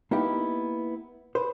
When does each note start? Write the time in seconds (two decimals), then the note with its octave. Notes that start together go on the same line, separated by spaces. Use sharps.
0.11 A#3 B3 D#4 E4 G4
1.35 B4 C5